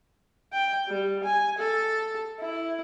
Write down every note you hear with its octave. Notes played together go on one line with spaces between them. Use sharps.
G5
G3
G#5
A4
E4